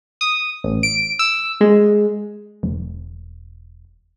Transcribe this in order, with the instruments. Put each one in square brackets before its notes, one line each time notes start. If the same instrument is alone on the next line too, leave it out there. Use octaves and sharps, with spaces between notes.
[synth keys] D#6
A1
D7
E6
G#3
[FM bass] E1